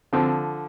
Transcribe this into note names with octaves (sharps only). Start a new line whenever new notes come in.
D3 F3 C4